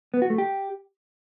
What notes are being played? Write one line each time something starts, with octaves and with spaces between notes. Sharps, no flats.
B3
F#4
A3
G4